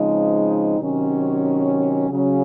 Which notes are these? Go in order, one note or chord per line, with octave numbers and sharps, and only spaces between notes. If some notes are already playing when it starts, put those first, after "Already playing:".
Already playing: C#3 F3 G#3 C4 D#4
C3 D#3 F#3 C#4
C#3 F#3 C#4